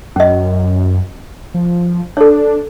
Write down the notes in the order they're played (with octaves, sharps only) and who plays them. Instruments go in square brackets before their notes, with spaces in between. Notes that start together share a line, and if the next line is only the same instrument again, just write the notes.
[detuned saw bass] F#2 [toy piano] C#4 D#5
[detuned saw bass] F3
[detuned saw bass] D4 [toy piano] A4 C#5